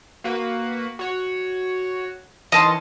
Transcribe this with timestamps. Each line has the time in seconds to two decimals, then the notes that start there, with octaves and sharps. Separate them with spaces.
0.24 A#3 F#4 B4
0.99 F#4 C#5
2.52 D#3 E3 C#4 D#5 A5 C6